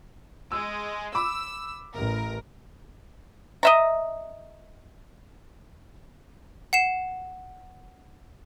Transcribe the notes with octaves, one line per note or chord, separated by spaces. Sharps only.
G#3 E6
B5 D6 E6
A1 A#4
D#5 E5 A#5
F#5 C7 E7